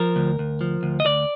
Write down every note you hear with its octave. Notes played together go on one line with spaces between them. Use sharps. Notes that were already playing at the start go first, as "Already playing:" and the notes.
Already playing: F3 A#4
D2
D2
F3
D2
D#5
D2 D5